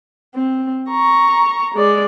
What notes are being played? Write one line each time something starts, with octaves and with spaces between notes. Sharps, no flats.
C4
A#5 C#6
G#3 D5